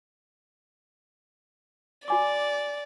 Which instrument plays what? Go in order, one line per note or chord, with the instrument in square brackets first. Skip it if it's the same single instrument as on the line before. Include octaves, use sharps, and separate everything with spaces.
[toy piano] F#4 G#5 D6 [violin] D5